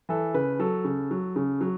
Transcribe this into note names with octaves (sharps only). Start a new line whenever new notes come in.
E3 A4
C#3 B4
F#3 A4
C#3
F#3
C#3
F#3